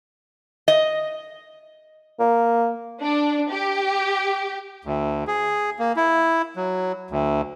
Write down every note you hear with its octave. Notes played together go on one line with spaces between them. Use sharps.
D#5
A#3
D4
G4
D2
G#4
A#3
E4
F#3
D2